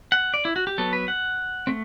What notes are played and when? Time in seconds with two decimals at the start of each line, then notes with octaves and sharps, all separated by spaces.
0.12 F#5
0.34 D5
0.45 E4
0.56 F#4
0.67 G4
0.78 F#3 B3 A4
0.93 B4
1.08 F#5
1.67 A3 C4